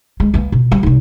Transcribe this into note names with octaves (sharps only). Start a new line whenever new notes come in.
G#3
A#3 B3
B2
F3 G3
C3 D#4